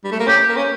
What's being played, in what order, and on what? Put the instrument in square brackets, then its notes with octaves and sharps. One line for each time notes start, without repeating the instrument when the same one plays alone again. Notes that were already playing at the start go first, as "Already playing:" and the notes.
[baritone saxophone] G3
A3
A#3
[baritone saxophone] C#4 [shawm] G4
[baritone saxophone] A#3
C#4